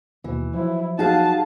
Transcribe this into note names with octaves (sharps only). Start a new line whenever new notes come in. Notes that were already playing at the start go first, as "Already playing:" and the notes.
D#2 B2 E3
F3 F#3 E4
D#4 F#4 G#4 F5 A5